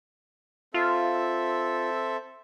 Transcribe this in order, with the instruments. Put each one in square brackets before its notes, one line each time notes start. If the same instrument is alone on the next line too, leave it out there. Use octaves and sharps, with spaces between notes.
[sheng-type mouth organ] C4 A4 E5 [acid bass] F4